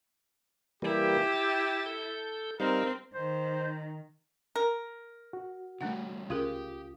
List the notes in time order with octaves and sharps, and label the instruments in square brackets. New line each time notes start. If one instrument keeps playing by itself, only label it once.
[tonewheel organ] E3 G3 A#3 [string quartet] E4 [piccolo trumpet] G4
[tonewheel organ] A6
A4 G6
[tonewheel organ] G3 D#4 F5 [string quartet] C4 [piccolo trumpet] A#4
[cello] D#3 [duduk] C5
[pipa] A#4
[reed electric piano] F#4
[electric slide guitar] D3 E3 G3 [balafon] A3 D4 F#5
[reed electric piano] C#2 F4 D#6 [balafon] C#4 G#4 A#4 [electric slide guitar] G4